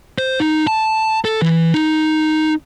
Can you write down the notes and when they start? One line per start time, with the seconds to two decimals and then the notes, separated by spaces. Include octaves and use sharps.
0.19 C5
0.40 D#4
0.67 A5
1.25 A4
1.42 E3
1.74 D#4